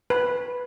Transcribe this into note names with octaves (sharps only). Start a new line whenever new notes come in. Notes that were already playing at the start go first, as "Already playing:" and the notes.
B4